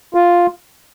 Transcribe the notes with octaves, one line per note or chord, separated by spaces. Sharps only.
F4